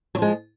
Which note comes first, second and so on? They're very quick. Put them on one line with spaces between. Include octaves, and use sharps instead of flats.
F#3 F3 G#3